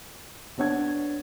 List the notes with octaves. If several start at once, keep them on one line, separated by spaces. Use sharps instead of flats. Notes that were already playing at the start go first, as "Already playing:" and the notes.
B3 D4 C#5 F#5 G#6